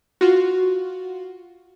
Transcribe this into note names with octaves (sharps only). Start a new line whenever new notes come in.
F4 F#4